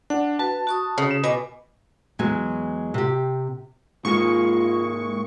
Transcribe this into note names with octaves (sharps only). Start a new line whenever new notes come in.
D4 F#5
F#4 B4 A5
F#4 C#6 D#6
C#3
E7
B2 D#5 G#5 D6
E2 F#3 G#3 G#5
C3 G4
G#2 G#3 A#3 F4 C#6